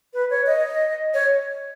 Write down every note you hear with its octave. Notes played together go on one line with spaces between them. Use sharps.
B4
C#5
D#5
C#5